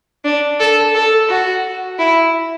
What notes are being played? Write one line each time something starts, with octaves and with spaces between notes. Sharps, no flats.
D4
A4
A4
F#4
E4